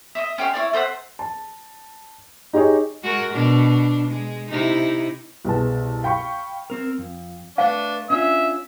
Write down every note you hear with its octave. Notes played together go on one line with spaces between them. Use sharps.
D#5 E5
C#4 G4 E5 C6
E4 C#5 D5
A4 C5 E5 F#5
A5
D#4 G4 G#4 C#5 D#5
G#3 F#4 A#4
B2 D4
G#3
C3 D#4 E4
C2 B2 G#3 B3 A5
F5 G5 B5 C#6
C4 A#4
F2
A3 D4 B4 F5
C#4 D4 F4 E5